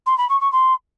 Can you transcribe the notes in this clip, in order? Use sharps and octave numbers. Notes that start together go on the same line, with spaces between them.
C6
B5
C#6
C#6
C6